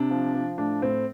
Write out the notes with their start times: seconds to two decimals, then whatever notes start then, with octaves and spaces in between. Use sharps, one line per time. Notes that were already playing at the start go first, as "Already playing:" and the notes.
Already playing: C3 D4
0.10 F3
0.34 F3
0.58 A2 D4
0.82 A2 C4